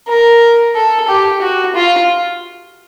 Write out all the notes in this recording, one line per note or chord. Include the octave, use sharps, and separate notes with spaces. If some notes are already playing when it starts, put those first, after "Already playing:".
A#4
A4
G4
F#4
F4